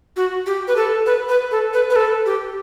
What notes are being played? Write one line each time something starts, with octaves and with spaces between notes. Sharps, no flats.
F#4
G4
B4
A4
B4
B4
A4
B4
B4
A4
G4